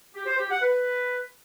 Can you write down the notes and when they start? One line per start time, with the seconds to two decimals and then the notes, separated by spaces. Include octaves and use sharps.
0.14 G4
0.26 C5
0.38 G4
0.50 F#5
0.62 B4